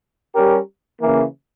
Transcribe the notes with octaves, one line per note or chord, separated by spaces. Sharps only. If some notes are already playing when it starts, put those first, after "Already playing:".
G3 C#4 G4 A#4
C#3 E3 A#3